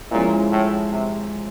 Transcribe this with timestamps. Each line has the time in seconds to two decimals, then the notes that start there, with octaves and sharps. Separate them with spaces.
0.11 A#2 F3 G#3 C#4 E4
0.51 A2
0.92 C3